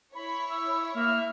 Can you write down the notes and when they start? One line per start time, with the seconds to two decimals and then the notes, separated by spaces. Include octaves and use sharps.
0.15 E4 C#5 B5
0.50 E6
0.95 A#3 E5 F6